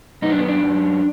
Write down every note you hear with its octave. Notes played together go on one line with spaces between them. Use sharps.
F#2 D#4
D4
B3
D4
F#2